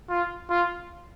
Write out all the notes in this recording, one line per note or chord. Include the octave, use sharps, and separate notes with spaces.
F4
F4